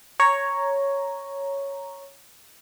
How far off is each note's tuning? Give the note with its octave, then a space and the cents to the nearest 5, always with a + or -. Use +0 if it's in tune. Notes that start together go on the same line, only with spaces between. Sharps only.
C#5 +0 A#5 +0